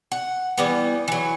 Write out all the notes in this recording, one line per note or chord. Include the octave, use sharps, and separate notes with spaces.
F#5
E3 G3 B3
E3 F#3